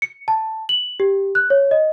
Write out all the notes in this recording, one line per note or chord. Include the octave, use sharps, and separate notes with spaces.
C#7
A5
F#7
G4
F#6
C#5
D#5